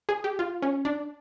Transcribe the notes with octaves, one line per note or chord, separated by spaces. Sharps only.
G#4
G4
F4
C#4
D4